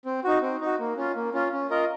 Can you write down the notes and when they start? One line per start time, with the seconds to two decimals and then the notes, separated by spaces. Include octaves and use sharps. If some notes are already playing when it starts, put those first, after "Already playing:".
0.06 C4
0.24 D#4 F#4
0.42 C4
0.61 D#4 F#4
0.79 A#3
0.97 C#4 F4
1.15 A#3
1.33 C#4 F4
1.52 C#4
1.70 F4 A#4 D#5